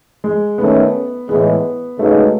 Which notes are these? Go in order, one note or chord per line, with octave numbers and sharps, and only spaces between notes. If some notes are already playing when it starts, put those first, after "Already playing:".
G#3
D#3 A3 B3 C#4
A2 E3 G#3 B3
C#3 G#3 A3 D#4 F#4 B4